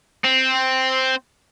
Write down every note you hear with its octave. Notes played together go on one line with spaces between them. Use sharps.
C4